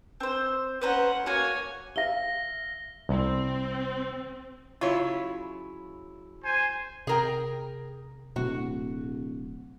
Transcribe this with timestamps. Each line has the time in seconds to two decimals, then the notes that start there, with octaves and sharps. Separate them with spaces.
0.20 C4 C5
0.82 C#4 B4 C5 F#5 A#5
1.26 A#3 F#4 C#5 G#5
1.96 E5 F5 A#6 G7
3.09 C2 C4
4.81 C#3 F#3 E4 F4 C#5
6.44 C5 G#5
7.07 C3 G#4 A#4 G5
8.36 D1 B2 F#4